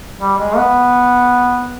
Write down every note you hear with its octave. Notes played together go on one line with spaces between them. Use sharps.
G3
G#3
B3